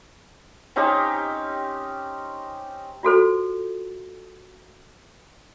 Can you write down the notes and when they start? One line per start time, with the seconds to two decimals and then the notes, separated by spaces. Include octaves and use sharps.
0.76 C4 C#4 D#4 G4
3.03 F4 F#4 A4 C5